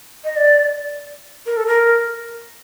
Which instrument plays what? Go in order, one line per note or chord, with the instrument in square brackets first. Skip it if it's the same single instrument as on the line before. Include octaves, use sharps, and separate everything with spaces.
[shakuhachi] D#5
D5
A#4
A4
A#4